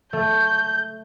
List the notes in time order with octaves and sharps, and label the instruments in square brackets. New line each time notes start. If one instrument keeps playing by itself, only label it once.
[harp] A3 [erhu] G6